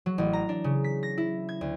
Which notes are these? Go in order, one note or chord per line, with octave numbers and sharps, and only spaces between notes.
F#3
A1
A#5
D4
C#3
B6
A#6
E4
G#6
D2